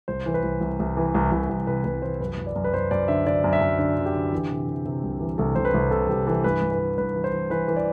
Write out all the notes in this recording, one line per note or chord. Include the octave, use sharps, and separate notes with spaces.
C2 C5
E3
B4
C2
C2
C2
E3
C2
C2
C2
C3 B4
C2 B4
E3 C5
F#2 B4
F#2
D5
F#2
B4
F#2 C5
F#2 D5
D3 E5
D3 D5
F#2
E5
F#2
D3 D5
D3
G4
D3
E3
C3
C3
C3
C2
E3
C2 A4
C2 C5
B4
C2
C3 A4
C2 G4
E3 A4
G2 B4
G2
B4
E3
G2 B4
E3
C5
E3
E3 B4
E3
D5